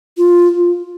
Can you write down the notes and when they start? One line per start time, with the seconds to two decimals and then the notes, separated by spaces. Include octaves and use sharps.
0.17 F4